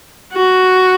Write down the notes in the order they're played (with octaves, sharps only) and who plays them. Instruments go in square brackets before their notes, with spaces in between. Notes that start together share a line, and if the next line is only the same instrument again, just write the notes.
[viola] F#4